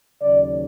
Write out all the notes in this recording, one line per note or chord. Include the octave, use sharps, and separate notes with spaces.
D#2 C#3 F#3 D5